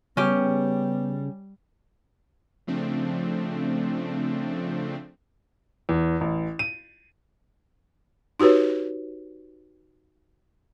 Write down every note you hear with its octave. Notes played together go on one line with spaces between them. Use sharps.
C#3 G3 B3 C#4 G4
C#3 F3 A3 C4 D4
E2
A1
D#7
D#4 F#4 G4 B4 C#5